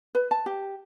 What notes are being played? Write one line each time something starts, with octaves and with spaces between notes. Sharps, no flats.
B4
A5
G4